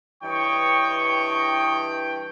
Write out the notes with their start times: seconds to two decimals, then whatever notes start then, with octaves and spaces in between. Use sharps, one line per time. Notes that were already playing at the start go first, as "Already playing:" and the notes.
0.23 G2 E3 C#5 D#5 G5 C#6